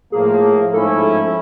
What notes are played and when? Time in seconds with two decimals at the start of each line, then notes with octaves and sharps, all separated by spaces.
0.12 A2 F3 A#3 G#4
0.73 G#2 F3 A3 C#4 E4 A4